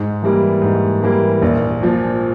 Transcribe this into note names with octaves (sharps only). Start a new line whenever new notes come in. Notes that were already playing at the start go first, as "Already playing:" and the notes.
Already playing: G#2
E3 G3 A#3
G#2
E3 G3 A#3
A#1
A#2 F3